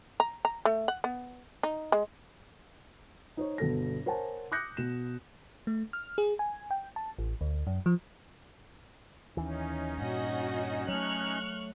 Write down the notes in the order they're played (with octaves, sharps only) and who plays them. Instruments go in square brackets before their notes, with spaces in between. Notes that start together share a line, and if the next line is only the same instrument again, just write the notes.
[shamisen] A#5
A#5
A3
F#5
B3
D#4
G#3
[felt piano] D#4 C5 C#5
G1 B2 A4 A#6
A#4 C5 C#5 F#5 G#5 A5
D6 D#6 F#6 G6 A#6 C#7
B2 E7
[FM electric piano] A3
F6
G#4
G#5
G5
A5
A1
D2
F#2
F3
[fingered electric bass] D#2 E3 [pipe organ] C#4 D#4
[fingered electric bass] G2 A#2 [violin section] F#4 D#5
[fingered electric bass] F#3 A3 [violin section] C#6 F6 F#6